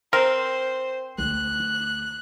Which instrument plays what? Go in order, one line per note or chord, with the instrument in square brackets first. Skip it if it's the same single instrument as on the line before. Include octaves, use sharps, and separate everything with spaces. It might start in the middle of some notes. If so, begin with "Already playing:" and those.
[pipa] C4 [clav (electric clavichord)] A#4 [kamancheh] C5
[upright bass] D2 [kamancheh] F#6